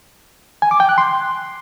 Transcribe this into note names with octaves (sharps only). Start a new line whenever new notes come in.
G#5
D6
G5
F#6
C6